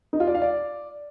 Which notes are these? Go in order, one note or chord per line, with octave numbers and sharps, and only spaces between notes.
D#4
F4
D5
F5
D5